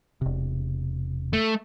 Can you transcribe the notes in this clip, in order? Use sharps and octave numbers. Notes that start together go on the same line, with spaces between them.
E1 C3
A3